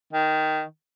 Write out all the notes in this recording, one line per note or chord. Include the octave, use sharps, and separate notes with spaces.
D#3